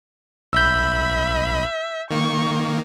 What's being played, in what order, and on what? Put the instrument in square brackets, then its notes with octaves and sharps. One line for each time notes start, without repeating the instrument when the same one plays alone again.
[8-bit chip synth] B1 B5 [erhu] E5 [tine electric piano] E6 G6
[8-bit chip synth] D#3 A#3 [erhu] C#6